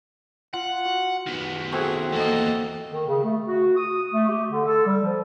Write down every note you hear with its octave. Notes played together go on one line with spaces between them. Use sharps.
F4 F#5
F#4
D#3 B3
A3 C4 F#4 G#4
E2 A#3 A4 D#5
D#3
C#3
A3
F#4
D#6
A3
G4
D3
A4
G3
F3